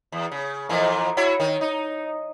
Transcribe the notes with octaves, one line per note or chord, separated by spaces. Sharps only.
E2
C#3
F2 A#2 E3
E4 F#4 C#5
D#3
D#4